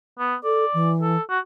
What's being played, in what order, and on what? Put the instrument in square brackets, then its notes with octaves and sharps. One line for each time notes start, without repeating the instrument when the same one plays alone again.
[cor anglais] B3
[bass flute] A4 [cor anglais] D5
[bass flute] E3
[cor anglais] A4
F#4